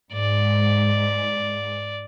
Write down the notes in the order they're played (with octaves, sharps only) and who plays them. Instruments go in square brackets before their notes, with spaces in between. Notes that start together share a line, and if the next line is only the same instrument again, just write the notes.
[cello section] G#2 [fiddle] D5